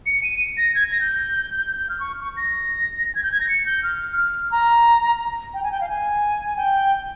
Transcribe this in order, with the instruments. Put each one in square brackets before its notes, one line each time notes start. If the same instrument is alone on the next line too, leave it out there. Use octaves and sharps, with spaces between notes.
[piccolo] C#7
D#7
A#6
G#6
A#6
G6
G6
F6
C#6
C#6
A#6
G#6
G6
G#6
A#6
C#7
G6
F6
F6
A#5
G5
G#5
G5
F5
G#5
G5